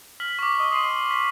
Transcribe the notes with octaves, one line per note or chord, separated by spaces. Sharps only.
F6 B6 F#7
C#6 D6
D#5
C6 D#7 F#7
B6